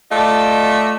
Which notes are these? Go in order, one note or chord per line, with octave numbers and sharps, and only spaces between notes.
A3 F4 D5 D#5